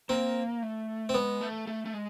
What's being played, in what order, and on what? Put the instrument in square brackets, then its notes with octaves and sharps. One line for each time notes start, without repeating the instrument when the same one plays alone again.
[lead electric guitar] A#3 [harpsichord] C4
[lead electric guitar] A3
[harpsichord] C4
[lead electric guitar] G#3 [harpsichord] B3
[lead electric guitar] A3
A3
A3
G#3